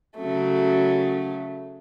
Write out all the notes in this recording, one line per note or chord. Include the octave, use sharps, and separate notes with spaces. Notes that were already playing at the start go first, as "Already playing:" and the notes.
C#3 F#3 A3